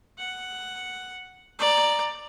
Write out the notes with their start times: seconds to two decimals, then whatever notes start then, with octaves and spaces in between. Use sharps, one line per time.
0.18 F#5
1.59 D5 A#5